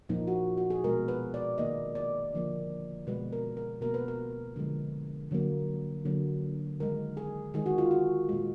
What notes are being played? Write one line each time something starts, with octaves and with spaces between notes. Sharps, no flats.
A#2 F3 A#3 D#4
F#4
F#4
G#4
B2 G#3 A#4
B4
D5
D#3 A#3 D#5
D5
D3 F3 A#3
B2 G#3 B4
A#4
A#4
B2 A#3 A#4
B4
A#4
D3 F3 G#3
D3 F#3 A#3
D3 F#3 A#3
D#3 G#3 A#4
G#4
D#3 G#3 G#4
F#4
F4
F#4
A#2 G#3